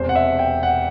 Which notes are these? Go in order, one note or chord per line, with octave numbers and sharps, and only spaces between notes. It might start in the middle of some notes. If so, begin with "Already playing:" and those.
Already playing: E1 E2 C3 C5
F#5
E5
G5
F#5